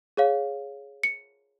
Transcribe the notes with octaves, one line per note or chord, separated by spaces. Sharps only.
G#4 C#5 F5
C#7